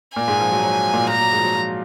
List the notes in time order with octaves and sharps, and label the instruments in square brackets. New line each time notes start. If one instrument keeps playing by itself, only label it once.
[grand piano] A#2 A#3 [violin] G#5
[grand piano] G#2 G#3
F3
F#3
F#3
A#2 A#3
[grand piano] A#2 A#3 [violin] A#5
[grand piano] F#3
G#2 G#3
F3
F#3
F3